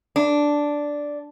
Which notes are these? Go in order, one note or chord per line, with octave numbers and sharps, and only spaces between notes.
D4